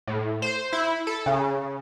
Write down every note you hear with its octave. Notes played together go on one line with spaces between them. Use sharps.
A2
C5
E4
A4
C#3